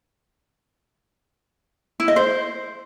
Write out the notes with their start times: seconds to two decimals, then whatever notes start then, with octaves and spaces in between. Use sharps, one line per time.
2.00 E4
2.08 D#5
2.16 C5